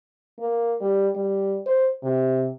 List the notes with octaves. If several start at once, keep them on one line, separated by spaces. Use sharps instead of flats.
A#3
G3
G3
C5
C3